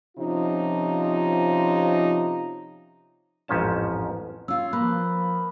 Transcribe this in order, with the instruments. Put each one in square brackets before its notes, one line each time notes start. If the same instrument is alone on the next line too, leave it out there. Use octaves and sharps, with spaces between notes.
[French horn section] C3 F3 C#4 D#4 F4
[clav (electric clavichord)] A1 F2 G#2 F3 C#4 A5
[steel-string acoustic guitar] C#4 F4 [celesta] E6
[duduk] F3 [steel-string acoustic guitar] A#3 [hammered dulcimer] B4